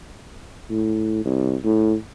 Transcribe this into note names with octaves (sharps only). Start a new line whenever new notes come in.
A2
C2
A2